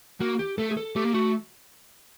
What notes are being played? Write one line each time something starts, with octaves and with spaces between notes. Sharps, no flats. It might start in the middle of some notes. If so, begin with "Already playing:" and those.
A#3 F#4
G4
A3 A4
G#4
A4
A3 G4
A#3
A3 F#4